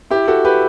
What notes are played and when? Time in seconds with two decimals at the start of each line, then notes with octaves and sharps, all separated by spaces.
0.11 E4 G4
0.28 F#4 A4
0.45 G4 B4